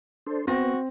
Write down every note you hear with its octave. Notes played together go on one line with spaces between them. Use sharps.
D4 A4 C5
B3 C4 F#4 A#6